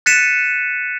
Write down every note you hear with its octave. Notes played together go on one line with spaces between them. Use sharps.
F#6 A6 B6 C#7 D#7 E7